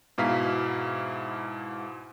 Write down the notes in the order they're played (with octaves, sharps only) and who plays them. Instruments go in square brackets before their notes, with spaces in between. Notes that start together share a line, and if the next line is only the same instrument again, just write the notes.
[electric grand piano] G#2 B2 E4 F5 A#5 B6